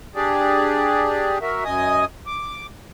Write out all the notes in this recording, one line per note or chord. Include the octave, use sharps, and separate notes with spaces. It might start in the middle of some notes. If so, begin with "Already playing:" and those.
D4 G4 G#4 D5
F#4 A#4 E5
F#2 D#5 G#5 D#6
D6